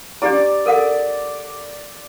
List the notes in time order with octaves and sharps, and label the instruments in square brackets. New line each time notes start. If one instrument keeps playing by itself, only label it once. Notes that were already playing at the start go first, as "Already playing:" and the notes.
[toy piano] D4 G4 A#5 [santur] D5
[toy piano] A4 A#4 F#5